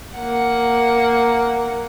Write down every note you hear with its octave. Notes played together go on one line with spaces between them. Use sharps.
A#3 F#5